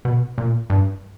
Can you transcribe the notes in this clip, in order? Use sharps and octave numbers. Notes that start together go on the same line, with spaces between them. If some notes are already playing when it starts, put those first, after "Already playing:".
B2
A#2
G2